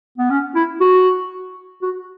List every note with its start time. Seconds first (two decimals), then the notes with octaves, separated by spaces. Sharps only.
0.18 B3
0.30 C#4
0.55 E4
0.81 F#4
1.82 F#4